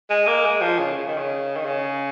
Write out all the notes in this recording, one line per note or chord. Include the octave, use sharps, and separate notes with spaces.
G#3
A#3
G#3
F3
C#3
C#3
D#3
C#3
D#3
C#3